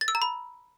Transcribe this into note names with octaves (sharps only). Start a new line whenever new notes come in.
A6
E6
A#5
B5